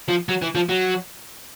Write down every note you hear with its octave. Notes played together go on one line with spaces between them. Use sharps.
F3
F#3
E3
F3
F#3